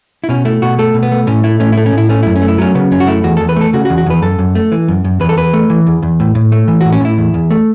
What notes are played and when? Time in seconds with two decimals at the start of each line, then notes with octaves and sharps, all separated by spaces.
0.24 E4
0.29 B2 C#4
0.45 A3 E4
0.62 B2 F#4
0.79 A3 A4
0.94 B2
1.03 B3
1.11 A3
1.27 A2 C#4
1.44 A3 E4
1.60 A2 C#4
1.72 A3 E4
1.86 C#4
1.93 A2
1.98 E4
2.09 A3 C#4
2.23 F#2 E4
2.36 C#4
2.42 A3
2.48 E4
2.58 F#3 C#4
2.75 C#3 B3
2.91 F#2 C#4
3.00 F#4
3.07 A3 E4
3.24 E2 F#4
3.37 E2 A4
3.49 B4
3.56 A3 A4
3.73 C#3 F#4
3.85 F#4
3.90 E2
3.98 F#4
4.06 E2 B4
4.22 F#2 A4
4.39 F#2
4.55 A3
4.72 E3
4.88 F#2
5.04 F#2
5.20 E2 B4
5.29 A4
5.37 E2 B4
5.53 A3
5.70 E3
5.86 E2
6.03 E2
6.20 A2
6.35 A2
6.52 A3
6.68 E3
6.81 F#4
6.85 A2
6.92 C#4
7.00 A2 E4
7.18 E2
7.34 E2
7.51 A3